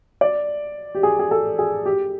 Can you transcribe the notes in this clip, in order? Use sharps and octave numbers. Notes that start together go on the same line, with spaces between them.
D5
G4
G#4
G#4
A4
G#4
G4